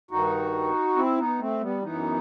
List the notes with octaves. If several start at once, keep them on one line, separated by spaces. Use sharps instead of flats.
G2 D#3 D#4 F#4
C4 E4
B3 D#4
A3 C4
G3 B3
F#2 E3 B3 D#4